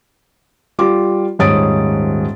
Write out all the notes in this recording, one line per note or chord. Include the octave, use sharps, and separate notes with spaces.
G3 F4 D6
D#1 G#2 C#5 D#6 A6 D7